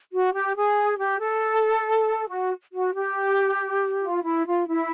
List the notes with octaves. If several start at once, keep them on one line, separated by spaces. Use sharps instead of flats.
F#4
G4
G#4
G4
A4
F#4
F#4
G4
F4
E4
F4
E4